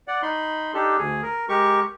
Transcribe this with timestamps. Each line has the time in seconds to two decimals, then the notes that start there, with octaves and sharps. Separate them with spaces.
0.08 D5 F#5
0.22 D#4 B5 C6
0.74 D4 D#4 G4 A4
0.98 D2 G#4
1.23 A#4
1.49 G#3 G4 A#4 C#6